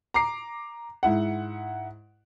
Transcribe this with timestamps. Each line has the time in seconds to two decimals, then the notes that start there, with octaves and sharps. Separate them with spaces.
0.14 A#5 D6 C7
1.03 G#2 E4 F#5